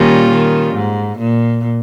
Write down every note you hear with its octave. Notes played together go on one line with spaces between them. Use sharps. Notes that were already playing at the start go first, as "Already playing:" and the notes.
Already playing: A#2 D#3 G3 C#4 F4
D#3
G#2
A#2